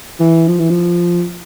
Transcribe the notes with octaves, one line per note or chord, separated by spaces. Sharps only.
E3
F3
E3
F3